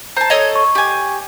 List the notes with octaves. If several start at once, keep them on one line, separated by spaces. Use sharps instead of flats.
C5 A5 A#5
A4 C#5 D#5
C#6
G4 G#5